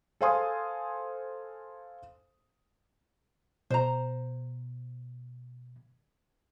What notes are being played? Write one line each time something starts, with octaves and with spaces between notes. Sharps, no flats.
A4 C5 F5 G#5 C6 D#6
B2 C5 A#5